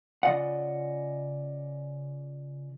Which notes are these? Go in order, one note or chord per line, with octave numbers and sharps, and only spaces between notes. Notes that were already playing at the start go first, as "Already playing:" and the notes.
C#3 F4 D5 D#5 F#5